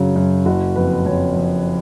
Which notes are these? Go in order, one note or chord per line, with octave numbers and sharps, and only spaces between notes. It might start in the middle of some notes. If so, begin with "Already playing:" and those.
Already playing: F#2 C#3 F#3
F#2
F#1 F#4
F2 B4
F2 C#5
F2